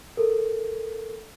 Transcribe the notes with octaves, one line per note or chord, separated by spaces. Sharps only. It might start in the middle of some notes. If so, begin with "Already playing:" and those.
A4 A#4